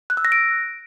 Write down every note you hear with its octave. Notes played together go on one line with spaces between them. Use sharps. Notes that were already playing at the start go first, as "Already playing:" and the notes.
F#6
E6
A#6
D7